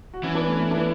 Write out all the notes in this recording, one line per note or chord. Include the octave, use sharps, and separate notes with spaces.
F#4
E3 C#4 E4
B3 D4
A3 C#4
A3 C#4
B3 D4